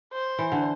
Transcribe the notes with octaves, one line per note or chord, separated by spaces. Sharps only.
C5
E3
D3